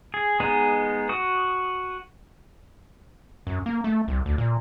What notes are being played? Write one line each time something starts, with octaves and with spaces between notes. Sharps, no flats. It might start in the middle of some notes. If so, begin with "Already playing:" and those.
G#4
G#3 B3 D#4 G#4
F#4 D#6
F#2
A#3
A3
C2
D2
A#2